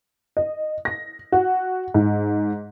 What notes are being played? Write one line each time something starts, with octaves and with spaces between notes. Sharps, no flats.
D#5
A#6
F#4
G#2